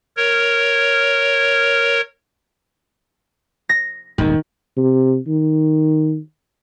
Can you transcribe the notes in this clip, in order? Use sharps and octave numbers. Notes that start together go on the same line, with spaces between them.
A#4 C#5
A#6
D#1 G#1 E2 D#3
C3
D#3